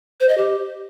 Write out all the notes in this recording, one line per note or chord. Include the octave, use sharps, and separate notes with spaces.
C5
D#5
G4